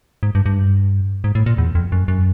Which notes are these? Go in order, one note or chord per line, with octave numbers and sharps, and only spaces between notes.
G#2
G2
G2
G#2
A2
A#2
E2
F2
F#2
F#2